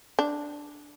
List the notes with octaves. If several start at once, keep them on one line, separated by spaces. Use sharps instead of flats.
D4